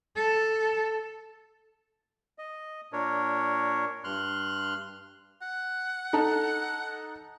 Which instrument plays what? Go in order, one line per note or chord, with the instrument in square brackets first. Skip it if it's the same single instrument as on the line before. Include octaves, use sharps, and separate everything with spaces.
[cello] A4
[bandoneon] D#5
A#2 D4 A#4 C#5
G2 C6 F6 F#6
[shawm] F#5
[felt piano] D#4 A4 A5